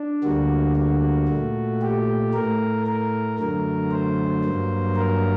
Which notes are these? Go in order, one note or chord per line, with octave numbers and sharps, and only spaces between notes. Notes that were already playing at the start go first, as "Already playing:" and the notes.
Already playing: D4
D2 D3 G3 A#3 F#4
F#4
A#2 A3
G4
A2 A3 A#4
A#4
F#2 D3 F#3 A3 A#4
C5
G2 F#3 A#3
A#4